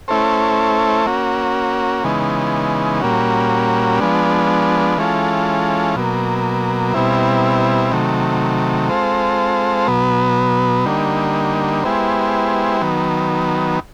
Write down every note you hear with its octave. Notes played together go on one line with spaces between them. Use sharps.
A3 C#4 E4 A4 C5
A#3 C#4 F#4
C#3 E3 G#3 B3 D#4
A#2 G3 A#3 C#4 F#4
F3 G#3 B3 D4
E3 G#3 C#4 F4 A4
B2 F#3 A#3
B2 G3 C4 E4
C3 D#3 F#3 A3
G#3 C4 F4 A4 C5
B2 F#3 B3
D3 G3 A#3 D#4
G#3 B3 E4 G4 C5
D#3 F#3 B3